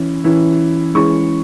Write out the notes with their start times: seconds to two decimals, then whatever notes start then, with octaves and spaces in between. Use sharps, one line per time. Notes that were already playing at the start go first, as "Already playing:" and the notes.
Already playing: E3 C#4 E4
0.24 E3 C#4 E4
0.94 E3 G#3 C#4 E4 C#6